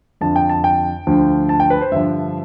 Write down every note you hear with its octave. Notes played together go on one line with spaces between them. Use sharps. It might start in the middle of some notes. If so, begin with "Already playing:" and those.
F2 D3 F3 A5
G5
A5
G5
D2 D3 F3
A5
G5
B4
C5
G2 D3 F3 E5